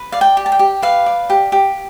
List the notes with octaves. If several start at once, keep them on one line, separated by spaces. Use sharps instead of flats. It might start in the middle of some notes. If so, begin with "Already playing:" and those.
Already playing: B4
D5 F5
G5
G4
A5
G5
G4
B4 F5
D5
G4
G4